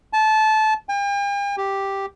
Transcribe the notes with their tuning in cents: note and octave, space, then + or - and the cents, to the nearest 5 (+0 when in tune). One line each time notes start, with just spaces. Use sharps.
A5 -20
G5 +45
G4 +0